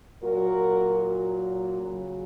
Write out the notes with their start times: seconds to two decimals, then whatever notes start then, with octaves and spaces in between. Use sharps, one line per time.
0.22 A#2 F#3 F#4 A#4
1.80 C#3 F#3